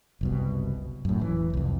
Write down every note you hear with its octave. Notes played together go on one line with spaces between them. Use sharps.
F#1 C2 B2
F#2 A2
E1 E3
C2 F2